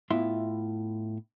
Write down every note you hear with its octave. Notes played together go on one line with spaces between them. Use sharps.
A2 B3 E4 F4 E5 C6